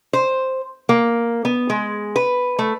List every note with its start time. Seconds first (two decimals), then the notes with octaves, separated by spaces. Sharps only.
0.13 C5
0.89 A#3
1.45 B3
1.70 G#3
2.16 B4
2.59 A3